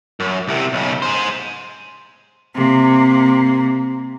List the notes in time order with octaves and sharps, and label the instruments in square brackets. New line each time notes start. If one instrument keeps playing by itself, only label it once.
[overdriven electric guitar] F#2
C2 C3
B1 C#3
G#4 C5
[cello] C3 A#3